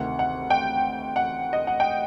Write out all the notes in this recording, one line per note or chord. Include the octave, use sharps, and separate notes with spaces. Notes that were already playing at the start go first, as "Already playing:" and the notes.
Already playing: D2 C3 D#3 F#5
F#5
G5
F#5
D#5
F#5
G5